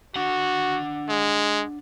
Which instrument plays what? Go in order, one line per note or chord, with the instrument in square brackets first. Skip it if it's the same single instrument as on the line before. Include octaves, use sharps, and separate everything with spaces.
[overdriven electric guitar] D4 F#5 [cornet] F#4
[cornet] G#3